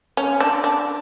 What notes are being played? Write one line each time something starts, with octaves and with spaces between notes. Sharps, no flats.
C#4
D4
D4